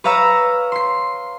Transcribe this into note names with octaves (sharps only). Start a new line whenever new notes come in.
B4 C#5 F5 A#5 E6 A#6
C6 C7